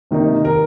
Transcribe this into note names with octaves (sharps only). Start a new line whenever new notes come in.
C3 D#3 A#3 D#4
A#4